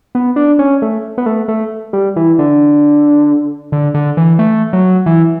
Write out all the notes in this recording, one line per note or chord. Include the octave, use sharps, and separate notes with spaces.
B3
D4
C#4
A3
B3
A3
A3
G3
E3
D3
D3
D3
E3
A3
F#3
E3